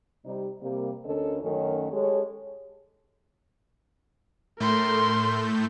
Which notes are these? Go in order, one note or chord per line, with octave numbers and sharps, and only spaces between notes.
C3 G3 D#4
C3 G3 A#3
D2 D3 C#4 A4 A#4 D#5
F#2 D#3 F#3 A3 C#4 D#4
G#3 G4 A4 C#5
A2 A3 A#4 C6 G6